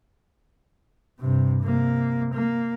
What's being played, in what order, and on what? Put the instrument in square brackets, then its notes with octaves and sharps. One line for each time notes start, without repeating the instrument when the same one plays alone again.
[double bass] G2 C3
C3 A#3
A#3